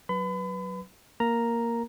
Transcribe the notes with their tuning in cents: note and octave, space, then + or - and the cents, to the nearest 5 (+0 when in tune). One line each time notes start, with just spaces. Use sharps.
F#3 +0 B4 +0 B5 +35
A#3 +0 A#4 +0 A#5 +0